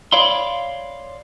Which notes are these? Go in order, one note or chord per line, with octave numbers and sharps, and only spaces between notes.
C#5 D5 F5 B5 C6